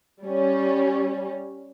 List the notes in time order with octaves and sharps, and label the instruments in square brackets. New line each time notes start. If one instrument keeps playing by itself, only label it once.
[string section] G3 C#4